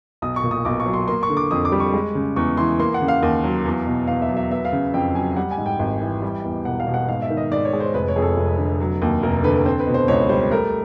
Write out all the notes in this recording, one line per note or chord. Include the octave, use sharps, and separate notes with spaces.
B1 D#6
C#6
A#2
D#6
B1 D6
C#6
F#3
C6
A#3 C6
C#6
D3
D6
F2 D#6
D6
G3
C#6
G#3
C#3
E2 C#6
E3 C6
A#3 C6
F#5
C#3
F5
D#2
F#3
E2
B2
E2 F5
E5
F#3
E5
B3 E5
F5
C#3
F2 G5
F#3 G#5
G3 F#5
G#5
G#2
G5
G#1
E3
G3
E2
E1 F#5
F5
B2
F#5
G#2 F5
E5
D#3
D#5
G#2 D5
C#5
G#3
C5
F1 B4
C#5
F2 G#4
A4
F1
D3
F#3
D#2
F1 A#4
D3 B4
C4 C5
B4
B2
C5
C#2 C#5
G3 C5
A3 A#4